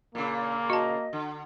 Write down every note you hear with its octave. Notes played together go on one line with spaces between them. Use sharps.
A#2 C#3 A#3
F#4 D#5 A5
D3